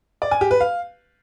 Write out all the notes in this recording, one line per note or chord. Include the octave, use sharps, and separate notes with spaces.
D5
G#5
G4
B4
F5